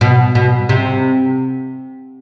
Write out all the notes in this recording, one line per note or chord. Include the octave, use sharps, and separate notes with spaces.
B2
B2
C3